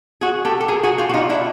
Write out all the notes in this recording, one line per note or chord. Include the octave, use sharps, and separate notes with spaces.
F#4 G#4
G4 A4
A4
G#4 A#4
F#4 G#4
F4 G4
F#4
D#4 F4
D4 E4